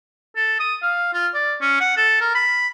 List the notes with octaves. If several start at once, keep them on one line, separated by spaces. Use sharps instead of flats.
A4
D#6
F5
F4
D5
C#4
F#5
A4
A#4
B5